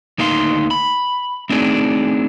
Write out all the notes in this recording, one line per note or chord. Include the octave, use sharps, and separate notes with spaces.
D2 A#3 D#4 F5 C6
B5
A3 C4 D4 D#4 G#4